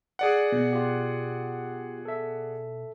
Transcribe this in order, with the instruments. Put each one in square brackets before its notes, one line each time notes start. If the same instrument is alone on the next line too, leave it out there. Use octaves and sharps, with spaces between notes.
[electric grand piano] G#4 D5 F#5
[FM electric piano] B2
[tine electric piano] F4 G4
A4 E5